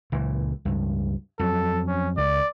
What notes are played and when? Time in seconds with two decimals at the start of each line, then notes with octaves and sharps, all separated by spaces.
0.12 C#2 A#2 E3
0.65 C#2 G2
1.39 F2 F#3 A4
1.88 C#4
2.18 C#2 D5